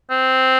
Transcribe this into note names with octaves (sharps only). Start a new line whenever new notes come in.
C4